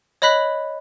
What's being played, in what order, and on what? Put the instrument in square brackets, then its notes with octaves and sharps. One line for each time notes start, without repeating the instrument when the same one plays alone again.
[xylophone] C#5 D#5 B5 F#6 B6 F#7